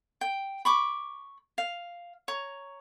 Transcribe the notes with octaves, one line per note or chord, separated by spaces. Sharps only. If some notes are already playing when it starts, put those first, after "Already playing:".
G5
B5 C#6 D6
F5
C#5 A#5